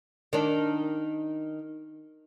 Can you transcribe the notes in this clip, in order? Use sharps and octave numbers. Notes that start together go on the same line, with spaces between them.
D#3 D4